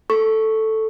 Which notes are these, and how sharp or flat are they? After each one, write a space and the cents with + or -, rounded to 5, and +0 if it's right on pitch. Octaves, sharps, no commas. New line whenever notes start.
A4 +0 C#6 +0